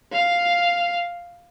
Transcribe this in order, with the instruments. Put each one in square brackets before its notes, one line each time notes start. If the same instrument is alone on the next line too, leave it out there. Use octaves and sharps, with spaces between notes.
[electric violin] F5